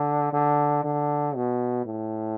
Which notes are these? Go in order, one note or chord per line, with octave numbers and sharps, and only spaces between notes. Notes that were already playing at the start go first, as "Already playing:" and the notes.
Already playing: D3
D3
D3
B2
A2